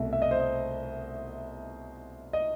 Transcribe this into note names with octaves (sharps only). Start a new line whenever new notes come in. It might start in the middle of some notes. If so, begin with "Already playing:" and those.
Already playing: C2 B2 A3 E5
E5
D#5
C5
D#5
D#5